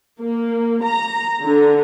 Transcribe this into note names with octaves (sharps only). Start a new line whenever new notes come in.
A#3
A#5
D3